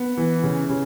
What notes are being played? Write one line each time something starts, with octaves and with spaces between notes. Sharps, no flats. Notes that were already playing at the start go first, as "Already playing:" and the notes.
Already playing: B3
E3
C#3
C#3